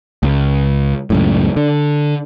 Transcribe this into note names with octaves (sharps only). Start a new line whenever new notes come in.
C#2
C#2 F#2 A2
D3